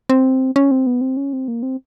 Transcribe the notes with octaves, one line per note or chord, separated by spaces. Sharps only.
C4
C#4
C4
B3
C4
C#4
C4
A#3
C4